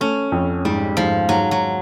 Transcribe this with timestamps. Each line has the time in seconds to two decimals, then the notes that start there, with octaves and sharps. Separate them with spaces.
0.01 A3 C#4
0.32 F2
0.65 G#2 G3
0.97 G#2 F3
1.29 G#2 F#3
1.51 F#3